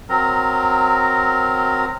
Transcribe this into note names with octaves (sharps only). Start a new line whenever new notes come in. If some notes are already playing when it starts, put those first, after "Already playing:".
F#3 C4 A#4 A#5